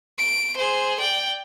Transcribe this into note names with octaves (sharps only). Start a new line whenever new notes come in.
D7
G#4 C5
D5 G5